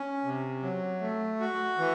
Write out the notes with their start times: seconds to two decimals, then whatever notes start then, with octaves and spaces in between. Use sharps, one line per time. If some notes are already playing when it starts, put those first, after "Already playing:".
Already playing: C#4
0.24 C3
0.63 F#3
1.01 A3
1.40 F#4
1.79 E3